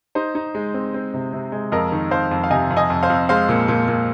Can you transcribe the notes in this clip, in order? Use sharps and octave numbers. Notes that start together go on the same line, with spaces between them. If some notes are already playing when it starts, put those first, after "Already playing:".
D#4 C5
D#4
G#3
C4
C4
C3
C3
G#3
F2 A#4 D#5
D#3
F2 C5 F5
F2
F5
C3 D#5 G#5
F2
D#5 G#5
F2
C5 F5
F2
G#3 C5 F5
A#2
A#2
A#2